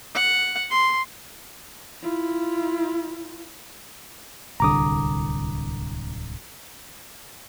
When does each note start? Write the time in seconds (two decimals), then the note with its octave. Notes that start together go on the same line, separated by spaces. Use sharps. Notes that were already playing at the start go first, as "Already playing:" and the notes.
0.14 F#5
0.70 C6
2.02 E4 F4
4.60 D1 C2 D3 A#5 D6 D#6